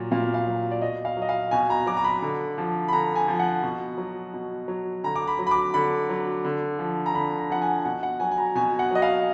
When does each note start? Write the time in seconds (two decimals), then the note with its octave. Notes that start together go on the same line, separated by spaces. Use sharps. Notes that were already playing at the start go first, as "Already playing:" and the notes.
Already playing: A#2 F#3
0.12 A#2 F5
0.34 F5
0.46 F#3
0.71 D5
0.81 B2 D#5
1.05 F5
1.17 F#3
1.22 D#5
1.29 F5
1.51 B2 G#5
1.70 A#5
1.86 F#3 D6
1.97 A#5
2.04 B5
2.22 D3
2.58 F3
2.88 B5
2.93 D3 A#5
3.15 G#5
3.28 F3
3.40 F#5
3.63 B2
3.98 F#3
4.34 B2
4.68 F#3
5.04 D3 A#5
5.16 D6
5.27 B5
5.39 F#3
5.47 B5
5.51 D6
5.74 D3 B5
6.09 F#3
6.44 D3
6.79 F3
7.06 A#5
7.14 D3 B5
7.39 A#5
7.50 F3 F#5
7.62 G#5
7.85 B2 F#5
8.03 F#5
8.20 F#3 G#5
8.31 G#5
8.38 A#5
8.55 B2 G#5
8.79 F#5
8.91 F#3 D#5
9.02 F5